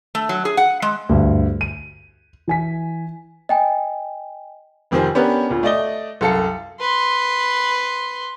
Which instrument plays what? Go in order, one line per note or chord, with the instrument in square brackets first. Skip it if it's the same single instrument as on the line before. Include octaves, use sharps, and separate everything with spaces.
[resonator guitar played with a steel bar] A3
F#3
G#4
F#5
G#3
[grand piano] D2 G2
D#7
E3 G#5 B6
[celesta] D#5 G5 G#5
[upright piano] F1 F2 D#3 G4 C5 G#5
B3 C#4 D4 G4 A#4 B4
D2 A#2
A3 D5 D#5 G7
C2 F#2 A4 F5 A5 C#7
[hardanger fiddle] B4 C6